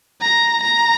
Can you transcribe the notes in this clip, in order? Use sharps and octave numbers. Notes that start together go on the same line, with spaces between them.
A#5
A#5